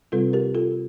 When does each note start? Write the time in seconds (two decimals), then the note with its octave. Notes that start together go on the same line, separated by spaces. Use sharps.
0.12 C3 G3 C4 F4 A4
0.33 G4 A#4
0.55 F4 A4